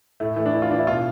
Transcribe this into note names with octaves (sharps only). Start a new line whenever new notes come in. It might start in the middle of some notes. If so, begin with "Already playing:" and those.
A2 A3
E3 A3
D4
E3 E4
F4
E3 D4
E4
B2 F4